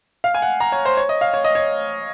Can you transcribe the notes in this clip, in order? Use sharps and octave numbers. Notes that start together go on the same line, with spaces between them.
F5
G#5
F#5
A#5
C#5
C5
C#5
D#5
F5
C#5
D#5
C#5